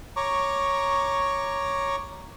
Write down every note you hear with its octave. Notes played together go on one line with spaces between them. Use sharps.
C#5 A#5 C#6 D6